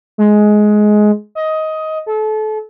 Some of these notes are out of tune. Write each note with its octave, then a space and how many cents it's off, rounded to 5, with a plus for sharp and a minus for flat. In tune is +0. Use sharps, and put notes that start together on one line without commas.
G#3 +15
D#5 +15
A4 -30